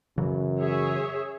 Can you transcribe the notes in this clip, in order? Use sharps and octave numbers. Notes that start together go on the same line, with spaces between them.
F#2 C#3 E3 F#3
G#4 C#5 E5